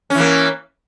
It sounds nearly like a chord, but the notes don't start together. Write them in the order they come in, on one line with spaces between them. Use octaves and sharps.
C#4 E3 A#3